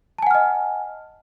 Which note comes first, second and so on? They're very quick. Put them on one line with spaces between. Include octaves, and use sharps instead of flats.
A5 G#5 F#5 F6 D#5